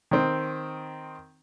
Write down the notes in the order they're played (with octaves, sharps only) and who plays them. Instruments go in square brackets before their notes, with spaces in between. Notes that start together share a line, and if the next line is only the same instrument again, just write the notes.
[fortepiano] D#3 C4